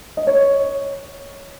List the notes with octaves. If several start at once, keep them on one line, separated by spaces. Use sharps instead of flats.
D#5
C#5